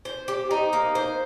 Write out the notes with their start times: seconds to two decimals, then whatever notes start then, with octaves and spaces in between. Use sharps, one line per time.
0.05 C5
0.28 G4
0.51 D#4
0.73 A#3
0.95 C5